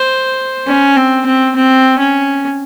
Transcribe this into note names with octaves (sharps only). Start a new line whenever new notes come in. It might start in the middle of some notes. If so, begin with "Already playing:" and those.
Already playing: C5
C#4
C4
C4
C4
C#4